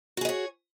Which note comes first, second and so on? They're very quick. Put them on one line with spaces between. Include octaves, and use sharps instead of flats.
F#4 G#4 D#5 C#5